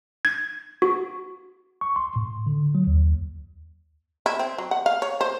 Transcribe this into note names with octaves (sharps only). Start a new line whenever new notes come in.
G#6
F#4
C#6
C6
A2
D3
F#3
D#2
E4
C4
F#3
F#5
F5
C#5
C5